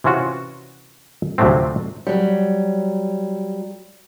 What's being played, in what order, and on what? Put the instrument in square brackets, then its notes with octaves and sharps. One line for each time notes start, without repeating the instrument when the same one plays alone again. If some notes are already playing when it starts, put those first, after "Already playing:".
[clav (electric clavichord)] C3 E3 C#4 F4 F#4
D2 C3 F3 F#3 A3 C4
[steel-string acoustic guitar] F#3 G3